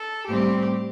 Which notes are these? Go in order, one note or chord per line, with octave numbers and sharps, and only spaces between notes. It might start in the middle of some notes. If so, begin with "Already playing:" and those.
Already playing: A4
A2 G3 C4 G4